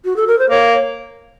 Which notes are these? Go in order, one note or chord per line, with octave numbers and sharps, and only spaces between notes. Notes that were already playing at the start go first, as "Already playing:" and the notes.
F#4
A4
A#4
C5
A#3 C#5